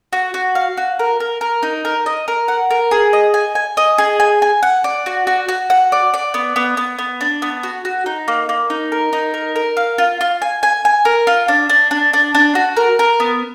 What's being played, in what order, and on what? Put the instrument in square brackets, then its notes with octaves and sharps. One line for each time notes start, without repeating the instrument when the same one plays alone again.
[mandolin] F#4
F#4
F5
F#4
A#4
A#4
A#4
D#4
A#4
D#5
A#4
F#5
A#4
G#4
D#5
G#5
G#5
D#5
G#4
G#5
G#5
F#5
D5
F#4
F#4
F#4
F#5
D5
D5
B3
B3
B3
B3
D4
B3
F#4
F#4
D#4
A#3
A#3
D#4
A#4
D#4
A#4
A#4
F5
F4
F4
G#5
G#5
G#5
A#4
F4
D4
D4
D4
D4
D4
F#4
A#4
A#4
B3